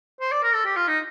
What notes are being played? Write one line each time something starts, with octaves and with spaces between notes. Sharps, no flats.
C5
D5
A#4
A4
G4
F4
D#4